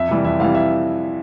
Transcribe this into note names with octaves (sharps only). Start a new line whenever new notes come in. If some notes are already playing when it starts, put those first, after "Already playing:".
Already playing: F2 E5
C3 E3 G3
F2 E5
C3 E3 G3 F5
E5